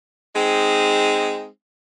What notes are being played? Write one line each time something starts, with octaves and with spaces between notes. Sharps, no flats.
G#3 C4 D#4